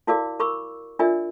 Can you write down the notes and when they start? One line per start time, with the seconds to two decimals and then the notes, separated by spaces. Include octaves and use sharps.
0.07 E4 F#4 A#4 D5 F5 D6
0.40 A#4 B5 C#6 D6 E6
0.99 D4 F4 A#4 D5 E5 G#5